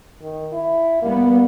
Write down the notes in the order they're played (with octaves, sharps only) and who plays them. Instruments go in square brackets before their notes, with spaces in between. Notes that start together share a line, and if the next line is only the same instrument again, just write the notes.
[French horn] D#3
E4
[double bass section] G3 B3 [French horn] A#3